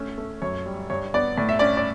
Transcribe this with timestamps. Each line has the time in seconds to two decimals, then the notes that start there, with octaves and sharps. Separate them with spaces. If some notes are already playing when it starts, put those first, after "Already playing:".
Already playing: A3 C#4
0.18 A3
0.42 F#2 C#5
0.66 G3
0.90 G2 C#5
1.14 B3 D5
1.38 A2 D5
1.49 E5
1.59 C#4 D5
1.77 D5